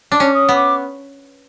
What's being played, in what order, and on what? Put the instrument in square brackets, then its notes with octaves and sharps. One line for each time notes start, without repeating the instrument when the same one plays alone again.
[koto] D4 [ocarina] D6
[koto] C#4
[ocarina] D#6
[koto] B3
[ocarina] D6